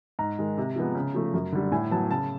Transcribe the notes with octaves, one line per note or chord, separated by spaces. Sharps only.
G#2 A#5
D#3 G#3
C3
F3 G#3 B3
C#3
F3 A3
F#2
D3 G3
A2 G#5
F#3 B3 A5
C#3 A5